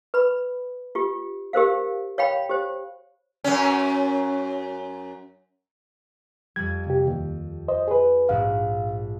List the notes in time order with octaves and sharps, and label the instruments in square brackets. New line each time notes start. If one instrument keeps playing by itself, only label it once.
[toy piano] B4 B5
F4 G4
G4 A#4 C5 F5
C#5 F5 G5 B5
G4 C5
[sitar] F#2 C#4
[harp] F2 G3 [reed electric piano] G#6
[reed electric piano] C3 G4
D#2
C5 D#5
G#4 B4
[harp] A#1 G#2 F#4 [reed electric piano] F5